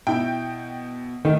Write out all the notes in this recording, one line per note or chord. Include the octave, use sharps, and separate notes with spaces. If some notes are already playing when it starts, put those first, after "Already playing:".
B2 E4 G5
D#3 A3